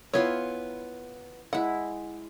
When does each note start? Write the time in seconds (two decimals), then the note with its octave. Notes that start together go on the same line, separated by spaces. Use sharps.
0.13 B3 E4 F4 C#5 G#5
1.53 G#3 E4 F#5